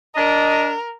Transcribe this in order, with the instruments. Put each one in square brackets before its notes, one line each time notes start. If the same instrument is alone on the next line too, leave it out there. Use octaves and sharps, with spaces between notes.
[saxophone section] D4 D#5 [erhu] A#4